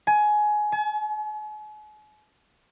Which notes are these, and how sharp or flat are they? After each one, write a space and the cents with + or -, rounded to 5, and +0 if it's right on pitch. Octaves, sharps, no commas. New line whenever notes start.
G#5 +20
G#5 +45